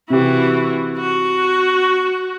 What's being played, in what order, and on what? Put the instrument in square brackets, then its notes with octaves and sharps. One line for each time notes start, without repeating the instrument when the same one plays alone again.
[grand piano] C3 G4 [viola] E3 F#4
[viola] F#4